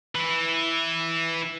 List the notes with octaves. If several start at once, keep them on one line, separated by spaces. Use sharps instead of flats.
E3